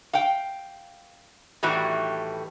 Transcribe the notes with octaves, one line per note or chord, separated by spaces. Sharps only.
F5 G5
A2 D#3 E3 G3 A3 F#4